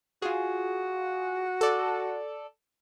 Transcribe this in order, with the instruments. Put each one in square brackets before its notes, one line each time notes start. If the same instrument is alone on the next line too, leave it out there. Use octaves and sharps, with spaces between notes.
[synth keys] F4 G#4 [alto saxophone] F#4
[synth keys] A4 D5